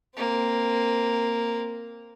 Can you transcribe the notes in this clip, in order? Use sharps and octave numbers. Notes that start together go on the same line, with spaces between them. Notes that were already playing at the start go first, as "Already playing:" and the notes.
A#3 C4